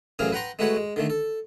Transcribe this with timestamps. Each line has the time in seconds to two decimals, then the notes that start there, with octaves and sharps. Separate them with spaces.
0.19 A1 F#2 E3 F#3 G#4 F5
0.32 B4 F#5 G5 A#5 C6
0.59 G#3 A3 F#4 B4 C#5 F#5
0.76 G#3
0.96 D3 D#3 A3
1.10 A4